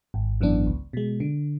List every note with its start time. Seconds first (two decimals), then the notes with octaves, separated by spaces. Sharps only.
0.14 G#1
0.41 F#2 E3 B3 D4
0.67 C#2
0.93 B2 G#3
1.20 D3